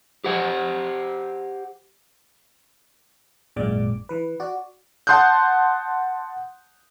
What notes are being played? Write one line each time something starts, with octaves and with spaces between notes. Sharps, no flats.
G4 C5 F#5
G#1 F#2 A#2 G#3 D5 D6
E3 B4
F#4 D5
F#5 A5 C6 D#6 F#6 G6